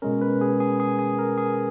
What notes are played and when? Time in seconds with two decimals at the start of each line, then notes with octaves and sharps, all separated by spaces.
0.02 B2 G#3 C#4 A#4
0.21 B4
0.41 G#4
0.60 G#4
0.80 G#4
0.99 G#4
1.19 A#4
1.38 G#4